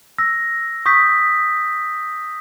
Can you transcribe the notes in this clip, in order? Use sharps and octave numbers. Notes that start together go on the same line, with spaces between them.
E6 A#6
C#6 D#6 G6 B6